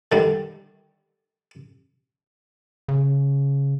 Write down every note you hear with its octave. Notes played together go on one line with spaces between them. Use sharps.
D3 D#3 G3
C#3